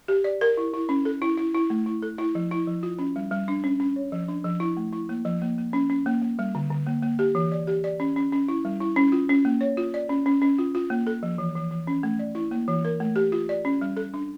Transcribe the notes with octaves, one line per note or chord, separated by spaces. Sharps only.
G4
D5
A#4
E4
E4
C#4
A4
E4
E4
E4
A3
E4
A4
E4
F3
E4
F3
F4
C#4
G3
G3
D4
C#4
C#4
C#5
F3
D4
F3
E4
A3
E4
A#3
F3
A#3
A#3
C#4
C#4
A#3
A#3
G3
D3
D3
A#3
A#3
G4
E3
D5
G4
D5
C#4
C#4
C#4
E4
G3
E4
C#4
F4
C#4
A#3
C#5
F4
D5
C#4
C#4
C#4
F4
F4
A#3
A4
F3
E3
E3
E3
C#4
A3
D5
E4
A#3
E3
A#4
A3
G4
F4
D5
C#4
G3
A4
D4